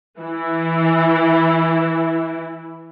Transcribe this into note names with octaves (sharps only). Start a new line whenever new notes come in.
E3 E4